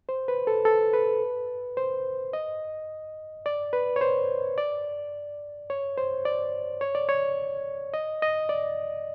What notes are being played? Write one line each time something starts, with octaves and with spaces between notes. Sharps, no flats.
C5
B4
A4
A4
B4
C5
D#5
D5
B4
C#5
C5
D5
C#5
C5
D5
C#5
D5
C#5
D#5
D#5
D5